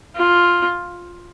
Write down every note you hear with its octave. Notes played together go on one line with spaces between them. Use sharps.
F4